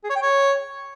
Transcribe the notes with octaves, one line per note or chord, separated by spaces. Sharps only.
G#4
C#5
G5
C#5